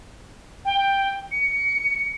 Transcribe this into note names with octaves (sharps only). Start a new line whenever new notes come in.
G5
C#7